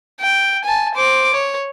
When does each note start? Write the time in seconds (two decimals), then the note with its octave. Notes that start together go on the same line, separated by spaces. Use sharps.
0.20 G5
0.64 G#5 A5
0.94 C5 D6
1.33 C#5